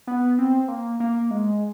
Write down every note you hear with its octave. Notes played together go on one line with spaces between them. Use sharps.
B3
C4
A#3
A#3
G#3